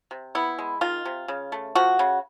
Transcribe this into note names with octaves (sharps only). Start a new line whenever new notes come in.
C3
B3 E4
G#3
D#3 F4
C3
C#3
A3
F3 F#4
C#3